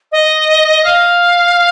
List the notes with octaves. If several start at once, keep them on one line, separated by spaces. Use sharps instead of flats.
D#5
F5